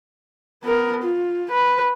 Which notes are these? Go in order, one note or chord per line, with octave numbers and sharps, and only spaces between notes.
B3 A#4
F4
B4